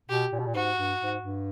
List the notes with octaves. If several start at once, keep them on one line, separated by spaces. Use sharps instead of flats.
B2 G4
A#2
B2
A#2
G#2 F#4
G2
G#2
G2